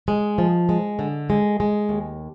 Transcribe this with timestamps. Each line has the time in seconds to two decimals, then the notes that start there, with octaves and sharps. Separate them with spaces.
0.08 G#3
0.38 F3
0.69 G#3
0.99 D3
1.30 G#3
1.60 G#3
1.89 D#2